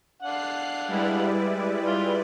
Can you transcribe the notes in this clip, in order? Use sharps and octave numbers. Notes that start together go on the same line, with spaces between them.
D4 F5 F#5 F#6 C7
G3 G#3 E4 B4 D5
F4